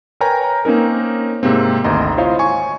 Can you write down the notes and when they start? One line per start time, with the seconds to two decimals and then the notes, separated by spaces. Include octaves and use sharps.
0.21 A#4 B4 C#5 G5 G#5 A#5
0.65 A#3 C4 C#4 D#4 A#4
1.43 G#2 C3 A#3 C4
1.84 G#1 D2 D#5 A#5 C6
2.17 E4 F4 C5 C#5 D#5 F5
2.39 G#5 C#6